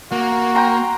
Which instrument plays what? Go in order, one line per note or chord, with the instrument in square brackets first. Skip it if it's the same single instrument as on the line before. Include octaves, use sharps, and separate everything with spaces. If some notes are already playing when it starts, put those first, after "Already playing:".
[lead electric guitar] A#3 [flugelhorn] F#4
[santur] G5 A#5 C6